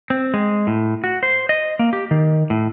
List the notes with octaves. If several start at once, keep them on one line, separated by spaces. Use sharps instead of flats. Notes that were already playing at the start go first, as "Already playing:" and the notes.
C4
G#3
A2
F#4
C5
D#5
A#3
G4
D#3
A2